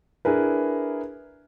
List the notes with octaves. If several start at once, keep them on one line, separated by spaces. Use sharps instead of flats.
D4 E4 G#4 A#4 B4